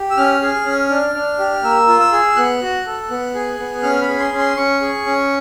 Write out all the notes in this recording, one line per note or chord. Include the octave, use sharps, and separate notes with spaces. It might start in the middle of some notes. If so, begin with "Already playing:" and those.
Already playing: G4
E6
C#4 F6
G#4
C#4
D4
D4
G4
A#3 E6
F4
E6
G#4
B3 F#6
F#4
A4
B3
G#4
B3
C#4 F6
B5
G#4
C6
C#4
C6
C#4 C#6
G#4
C#4